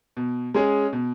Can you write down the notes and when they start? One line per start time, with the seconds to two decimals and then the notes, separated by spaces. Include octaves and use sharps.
0.17 B2
0.54 G#3 C#4 G#4
0.93 B2